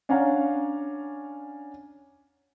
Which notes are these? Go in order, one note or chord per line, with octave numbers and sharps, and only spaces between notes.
C#4 D4 C#5 F5 F#5 A#5